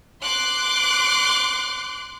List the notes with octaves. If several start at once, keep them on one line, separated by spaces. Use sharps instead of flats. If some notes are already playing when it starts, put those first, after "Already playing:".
C6 D6 F#6